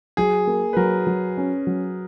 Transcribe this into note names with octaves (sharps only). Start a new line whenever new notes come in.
F#3 G#4
A#3
B4
F#3 A#4
F#3
C#4
F#3